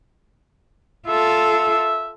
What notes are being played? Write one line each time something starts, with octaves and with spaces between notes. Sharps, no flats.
F4 A4 E5